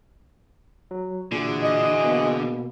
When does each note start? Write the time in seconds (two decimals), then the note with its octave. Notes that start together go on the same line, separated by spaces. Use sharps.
0.91 F#3
1.32 A#2 D3 E3 F#4 G#4
1.63 D#5
2.04 B2 A#3